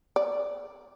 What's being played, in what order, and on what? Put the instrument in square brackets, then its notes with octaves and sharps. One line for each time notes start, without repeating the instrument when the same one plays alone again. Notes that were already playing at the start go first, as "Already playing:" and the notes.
[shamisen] D5